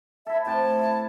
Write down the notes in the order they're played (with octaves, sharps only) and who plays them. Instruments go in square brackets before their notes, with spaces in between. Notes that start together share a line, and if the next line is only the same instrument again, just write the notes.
[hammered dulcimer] E4 A4 [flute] E5
[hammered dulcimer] A2 C3 G5 [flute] A5
[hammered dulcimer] E4